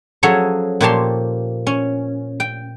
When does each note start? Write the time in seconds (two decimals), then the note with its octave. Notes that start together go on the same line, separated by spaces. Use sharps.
0.23 F3 F#3 C#4 G#4 A4 C#5
0.81 A#2 F3 G4 C#5 A5 C6
1.67 C#4
2.40 G5